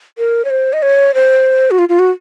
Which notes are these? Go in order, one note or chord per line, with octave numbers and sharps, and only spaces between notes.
A#4
C#5
C5
D#5
C#5
C5
F#4
F4
F4
F#4